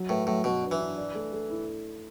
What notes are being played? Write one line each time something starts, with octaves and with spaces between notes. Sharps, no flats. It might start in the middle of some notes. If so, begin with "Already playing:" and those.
Already playing: F#3
A2 B4
A2 F#3
B2 F#3
D4
E3
D4
D5
A3
A3
E4